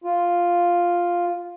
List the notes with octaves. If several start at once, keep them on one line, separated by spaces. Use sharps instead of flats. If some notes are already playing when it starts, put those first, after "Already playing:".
F4